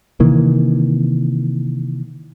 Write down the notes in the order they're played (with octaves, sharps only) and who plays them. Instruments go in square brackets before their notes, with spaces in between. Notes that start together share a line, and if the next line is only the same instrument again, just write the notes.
[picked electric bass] C3 D#3 E3 A#3